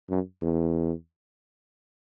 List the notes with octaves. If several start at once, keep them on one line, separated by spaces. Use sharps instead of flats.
F#2
E2